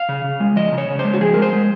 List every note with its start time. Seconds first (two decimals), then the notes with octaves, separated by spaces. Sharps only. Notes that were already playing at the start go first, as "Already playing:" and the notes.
Already playing: F5
0.09 C#3
0.24 C#3
0.40 G#3
0.56 F3 D#5
0.72 C#3
0.78 C#5
0.88 C#3
0.99 C5
1.05 G#3
1.14 F#4
1.20 F3 G#4
1.34 G#3 A#4
1.42 C5
1.53 G#3